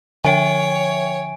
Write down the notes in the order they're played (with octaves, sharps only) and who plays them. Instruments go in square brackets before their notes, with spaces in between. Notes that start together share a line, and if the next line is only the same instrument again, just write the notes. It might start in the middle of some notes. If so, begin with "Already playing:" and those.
[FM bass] D3 [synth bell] F3 E5 G5 [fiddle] C#5 [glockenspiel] G#5 D7